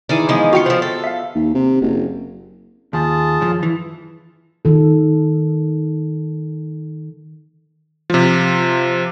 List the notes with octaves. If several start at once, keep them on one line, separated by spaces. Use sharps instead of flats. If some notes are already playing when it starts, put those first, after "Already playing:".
D#3 E3 G#4 D5
F3 G#3 B3
F4 F#4 F5 G5 C#7
D3 F3 C5
A4
E5 F5
D#2
C3
F#1
D#2 F4 G#4 A5
F#2 F3
E3
D#3 A4
C3 F3